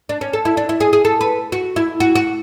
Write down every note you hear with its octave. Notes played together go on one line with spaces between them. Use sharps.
D4
C#4
A4
E4
D4
E4
G#4
G#4
A4
B4
F#4
E4
F#4
F#4